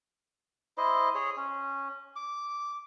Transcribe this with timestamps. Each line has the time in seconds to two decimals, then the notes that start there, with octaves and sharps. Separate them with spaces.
0.78 E4 C5 D#5
1.15 G#4 C#5
1.37 C#4
2.16 D6